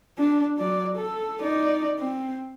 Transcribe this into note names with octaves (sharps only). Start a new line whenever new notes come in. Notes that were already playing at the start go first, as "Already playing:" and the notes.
D4
F#3 D5
A4
D#4 D5
C4